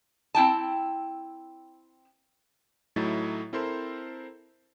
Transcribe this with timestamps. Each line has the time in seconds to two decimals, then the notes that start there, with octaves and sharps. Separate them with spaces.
0.35 C4 E4 G5 A5
2.96 A2 F#3 A3 D#4 E4 A6
3.53 C4 E4 A4 A#4 C5 C6